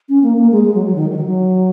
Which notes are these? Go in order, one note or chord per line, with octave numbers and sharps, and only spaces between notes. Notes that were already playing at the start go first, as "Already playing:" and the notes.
C#4
A#3
A#3
G#3
G#3
F#3
F#3
D#3
F#3
D#3
F#3